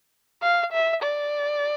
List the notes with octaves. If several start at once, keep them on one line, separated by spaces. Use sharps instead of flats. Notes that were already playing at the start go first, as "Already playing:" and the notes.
F5
E5
D5